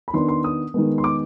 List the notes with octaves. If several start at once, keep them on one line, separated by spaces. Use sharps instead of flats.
B5
D#3 B3 D4 C6
C6
D#6
D#3 G#3 B3
C6
D6